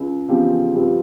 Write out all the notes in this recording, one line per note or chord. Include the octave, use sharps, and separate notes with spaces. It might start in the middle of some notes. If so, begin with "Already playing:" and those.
Already playing: C#2
E2 C#3 F3 C4 G4
G2 F3 C4 G4